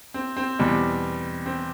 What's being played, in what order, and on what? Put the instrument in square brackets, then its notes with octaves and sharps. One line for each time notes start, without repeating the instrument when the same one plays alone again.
[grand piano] C4
C4
[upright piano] E2 B2 G3
[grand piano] C4